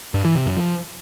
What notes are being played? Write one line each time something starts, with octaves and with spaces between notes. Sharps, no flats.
G2
E3
C3
F#2
F3